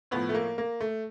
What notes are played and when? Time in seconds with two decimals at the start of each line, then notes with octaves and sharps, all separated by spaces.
0.11 A2 F3 B3
0.29 A3
0.35 A#3
0.58 A#3
0.81 A3